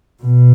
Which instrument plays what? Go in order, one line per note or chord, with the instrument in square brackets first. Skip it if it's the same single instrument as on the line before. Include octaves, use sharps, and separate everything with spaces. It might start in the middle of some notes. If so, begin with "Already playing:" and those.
[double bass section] B2